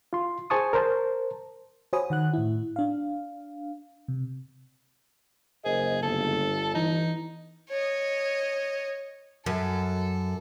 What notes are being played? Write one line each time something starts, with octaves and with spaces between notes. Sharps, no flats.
F4 C6
G#4 C5 G#5 A5 C#6 D#6
A#4 C5 A5
F#4 C5 C#5 G#5 B5 D#6
D#3 F#5 F#6
A2 E4
D4 F5
C3
F#1 G#4 A#4 C5 D#5
G1 A4
E3 D#4
C#5 D#5
F#2 A4